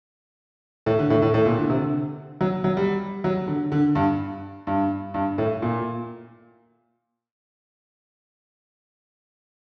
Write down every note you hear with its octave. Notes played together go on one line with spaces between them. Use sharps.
A2
D3
A2
A2
A2
A#2
D3
C3
D3
F#3
F#3
G3
F#3
D3
D3
G2
G2
G2
A2
A#2